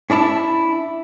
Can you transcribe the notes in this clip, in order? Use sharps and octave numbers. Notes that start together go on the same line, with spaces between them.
C#4 D4 E4 A5